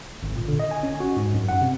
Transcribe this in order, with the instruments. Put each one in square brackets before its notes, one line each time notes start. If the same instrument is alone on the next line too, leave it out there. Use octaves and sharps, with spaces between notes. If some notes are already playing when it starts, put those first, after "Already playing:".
[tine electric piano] G#1
A#2
D3
D#5
G#5
C#4
F#4
G#2
F#2
F#5
C3